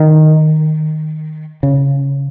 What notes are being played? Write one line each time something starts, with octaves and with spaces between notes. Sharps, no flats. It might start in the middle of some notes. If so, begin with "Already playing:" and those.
Already playing: D#3
C#3